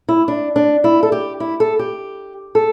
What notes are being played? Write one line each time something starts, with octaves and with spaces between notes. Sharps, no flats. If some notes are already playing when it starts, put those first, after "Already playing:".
E4
D4
D4
E4
A4
G4
E4
A4
G4
A4